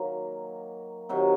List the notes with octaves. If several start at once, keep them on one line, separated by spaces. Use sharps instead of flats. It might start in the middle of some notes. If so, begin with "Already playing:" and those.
Already playing: D#3 F#3 A#3
C3 D#3 F#3